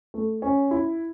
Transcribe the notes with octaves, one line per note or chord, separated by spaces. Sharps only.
A3
C#4
E4